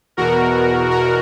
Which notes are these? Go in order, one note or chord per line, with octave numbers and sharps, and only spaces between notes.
E2 B2 F#4 A#4
F#4 A#4